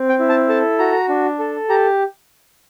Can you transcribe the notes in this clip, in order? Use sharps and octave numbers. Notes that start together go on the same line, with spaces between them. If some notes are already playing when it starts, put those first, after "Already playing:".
Already playing: C4
G5
E4
A5
A4 A5
F#4 A#5
D4
A4
G4 A#5